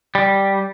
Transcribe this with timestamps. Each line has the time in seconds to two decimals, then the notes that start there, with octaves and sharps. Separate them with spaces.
0.15 G3